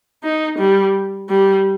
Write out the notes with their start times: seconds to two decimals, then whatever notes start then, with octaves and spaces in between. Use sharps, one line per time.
0.24 D#4
0.59 G3
1.29 G3